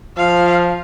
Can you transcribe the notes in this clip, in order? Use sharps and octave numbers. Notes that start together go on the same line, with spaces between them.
F3 F5